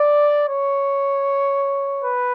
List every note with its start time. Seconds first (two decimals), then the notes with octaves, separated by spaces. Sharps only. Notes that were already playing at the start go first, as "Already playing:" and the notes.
Already playing: D5
0.47 C#5
2.04 B4